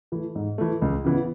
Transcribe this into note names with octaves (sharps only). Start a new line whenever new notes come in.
E3 A3
G#2
E3 A3
C#2
C#3 E3 B3